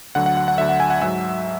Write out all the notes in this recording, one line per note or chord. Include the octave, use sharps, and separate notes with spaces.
D2 D3 F#3 F#5
F#5
F#5
F#5
D2 D3 F#3 E5
F#5
G#5
F#5
G#2 F#3 E5